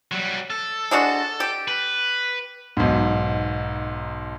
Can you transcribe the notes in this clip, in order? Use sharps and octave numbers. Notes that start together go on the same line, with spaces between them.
F#3 G3
A4
G#3 D4 F#4
G4
B4
B1 G#2